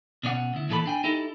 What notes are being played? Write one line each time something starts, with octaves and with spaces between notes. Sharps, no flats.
B2 C#4 D5 F#5
D2 E4
A#2 E3 A4 D5 B5
D4 G5 G#5
D#4 E4 G4 A4